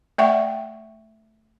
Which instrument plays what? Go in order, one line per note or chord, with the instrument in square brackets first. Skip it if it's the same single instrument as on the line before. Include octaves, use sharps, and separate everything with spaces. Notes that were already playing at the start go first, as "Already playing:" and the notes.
[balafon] A3 D5 E5 F#5 G5 C#6